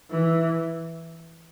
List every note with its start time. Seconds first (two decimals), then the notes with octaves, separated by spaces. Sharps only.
0.11 E3